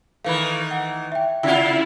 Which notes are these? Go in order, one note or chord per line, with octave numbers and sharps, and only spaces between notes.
D#3 E3 A3 F5 B5
F#5
E5 G5
C3 E4 F4 E5 F#5